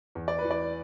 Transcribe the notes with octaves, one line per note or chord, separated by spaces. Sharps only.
E2
D5
B4
E3
D5